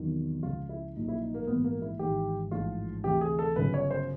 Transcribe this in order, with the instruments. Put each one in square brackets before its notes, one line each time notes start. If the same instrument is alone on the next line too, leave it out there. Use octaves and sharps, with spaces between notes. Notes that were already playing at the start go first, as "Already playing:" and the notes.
Already playing: [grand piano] E2 C3 D#3 F#3
C#2 C#3 F3 F4
E4
A#1 A#2 F#3 D#4
E4
D#4
A#3
A#1 G#2 E3 B3
A#3
E4
G#1 G#2 E3 G4
A1 G#2 F3 F4
D2 C3 E3 G4
G#4
A4
G1 F#2 C#3 B4
C#5
C5